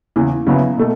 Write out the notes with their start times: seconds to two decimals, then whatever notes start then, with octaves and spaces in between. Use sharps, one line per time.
0.16 E2 C#3 E3
0.47 C#3 F#3 B3 E4
0.78 B2 A3